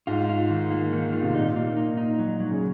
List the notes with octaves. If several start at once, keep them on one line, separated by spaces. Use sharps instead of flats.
G#2 F4
F4
D#3
A#3
D#3
F4
C3
A#2 D#4
A#3
D#4
D#4
F#3
F#3
C#3